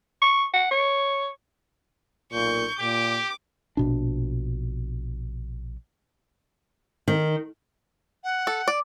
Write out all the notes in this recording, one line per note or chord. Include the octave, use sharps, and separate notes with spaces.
C#6
F#5
C#5
B1 A#2 C#6 G6
A#2 G4 D6
A#1 B2 D4
D#3
F#5
A4
D5